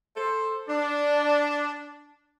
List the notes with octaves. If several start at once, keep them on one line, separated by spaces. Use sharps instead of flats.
A4 C5
D4